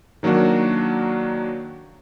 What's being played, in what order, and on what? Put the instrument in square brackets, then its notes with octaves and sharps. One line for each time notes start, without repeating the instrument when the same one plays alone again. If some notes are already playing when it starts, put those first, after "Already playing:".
[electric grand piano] D#3 F#3 A#3 D4 F#4